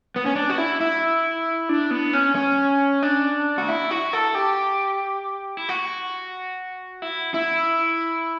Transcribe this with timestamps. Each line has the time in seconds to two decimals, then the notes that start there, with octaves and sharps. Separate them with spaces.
0.16 B3
0.26 C#4
0.36 D4
0.50 F#4
0.58 E4
0.81 E4
1.69 D4
1.91 B3
2.13 C#4
2.35 C#4
3.03 D4
3.58 F#4
3.69 E4
3.91 F#4
4.13 A4
4.35 G4
5.57 E4
5.69 F#4
7.02 E4
7.34 E4